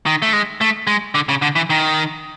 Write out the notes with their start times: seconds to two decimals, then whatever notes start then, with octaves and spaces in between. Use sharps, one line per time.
0.06 D#3
0.22 A3
0.33 G#3
0.61 A3
0.87 G#3
1.15 D3
1.29 C#3
1.42 D3
1.56 E3
1.70 D#3